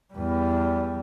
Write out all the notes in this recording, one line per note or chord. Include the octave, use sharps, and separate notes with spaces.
E2 G3